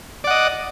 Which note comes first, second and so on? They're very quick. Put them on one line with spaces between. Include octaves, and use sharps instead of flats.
D5 F#5 D#5